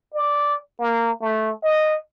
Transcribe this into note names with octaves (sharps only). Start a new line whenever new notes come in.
D5
A#3
A3
D#5